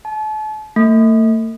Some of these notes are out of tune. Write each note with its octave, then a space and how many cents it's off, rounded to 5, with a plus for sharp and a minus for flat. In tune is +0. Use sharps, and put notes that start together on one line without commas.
A5 -40
A3 +40